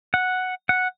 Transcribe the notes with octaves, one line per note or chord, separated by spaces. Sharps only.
F#5
F#5